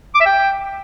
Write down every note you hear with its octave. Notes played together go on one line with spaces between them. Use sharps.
D6
E5
G5